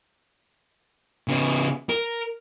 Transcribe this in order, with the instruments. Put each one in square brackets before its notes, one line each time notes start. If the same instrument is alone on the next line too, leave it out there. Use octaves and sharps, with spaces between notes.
[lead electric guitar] C#3 B3
A#4